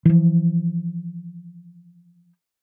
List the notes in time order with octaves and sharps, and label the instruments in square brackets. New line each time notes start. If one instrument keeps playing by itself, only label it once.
[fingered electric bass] E3 F3